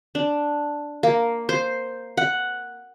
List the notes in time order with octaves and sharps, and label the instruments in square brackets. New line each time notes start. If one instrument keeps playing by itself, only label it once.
[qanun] D4
A#3
C5
F#5